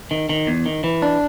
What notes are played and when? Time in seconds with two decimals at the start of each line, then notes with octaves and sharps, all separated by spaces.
0.11 D#3
0.29 D#3
0.47 E2
0.66 D#3
0.84 E3
1.02 D4